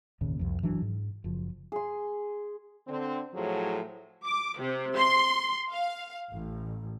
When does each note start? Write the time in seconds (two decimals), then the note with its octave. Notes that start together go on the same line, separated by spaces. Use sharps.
0.21 G#1 D#2 A#2 C#3
0.39 C2 F2
0.62 G1 E3 F#3 D4
0.82 G#2
1.24 F#1 F3
1.72 G#4 C6
2.87 D3 C4
3.34 A2 F3 F#3 G#4
4.26 D6
4.59 C3
4.96 C6
5.71 F5
6.33 A1